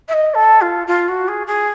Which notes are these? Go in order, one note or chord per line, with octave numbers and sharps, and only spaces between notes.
E5
D#5
A4
F4
F4
F#4
G#4
G#4